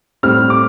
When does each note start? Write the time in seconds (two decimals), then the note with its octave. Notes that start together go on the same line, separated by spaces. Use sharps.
0.23 A2 G3 C4 F6
0.50 D6